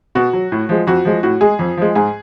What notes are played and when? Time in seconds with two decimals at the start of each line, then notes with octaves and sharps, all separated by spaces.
0.15 B2 F#4
0.33 F#3
0.52 A2
0.69 F3 G#3
0.87 F2 F#4
1.05 F3 G#3
1.23 A2 F#4
1.41 G#3 G#4
1.59 F2
1.77 F3 G#3
1.95 G#2 G#4